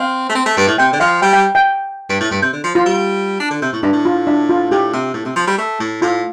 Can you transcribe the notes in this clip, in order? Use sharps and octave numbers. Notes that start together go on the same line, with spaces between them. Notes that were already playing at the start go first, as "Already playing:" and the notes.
Already playing: C4 F5
A3
C4
A3
G2
A2
C3 G5
D3
F3 F5
G3 G5
G5
G5
G2
A2
G2
C3
D3
F3
F3 F4
G3
D4
D3
C3
A2
G2 D4
A2
F4
D4
F4
A2 G4
C3
A2
C3
F3
G3
A3
A2
A2 F4